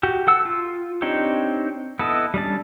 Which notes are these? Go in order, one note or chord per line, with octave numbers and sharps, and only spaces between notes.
F#4 G4
A4 F#5 E6
F4
C4 D4 D#4 G4 C#5
B3 E4 A4 D#5
G3 C#4 D4 A5